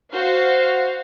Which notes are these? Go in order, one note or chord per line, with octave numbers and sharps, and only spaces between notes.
F#4 C5 F5